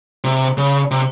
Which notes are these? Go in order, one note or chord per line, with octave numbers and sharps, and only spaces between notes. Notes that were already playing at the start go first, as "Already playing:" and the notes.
C3
C#3
C3